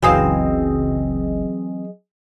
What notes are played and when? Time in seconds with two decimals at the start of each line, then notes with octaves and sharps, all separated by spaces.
0.02 F#1 C#2 E3 F#3 C4 G#4 D#5 F5